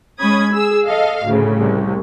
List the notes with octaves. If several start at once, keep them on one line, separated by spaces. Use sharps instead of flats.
G#3 C#4 B5 D#6 G#6
G#4 E6
A4 D#5 F5
D2 A2 C#3
C2